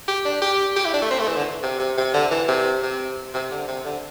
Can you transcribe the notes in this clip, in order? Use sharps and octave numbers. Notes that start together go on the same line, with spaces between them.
G4
D4
G4
G4
E4
D4
A3
C4
A3
E3
D3
C3
C3
C3
D3
E3
C3
C3
C3
D3
C3
D3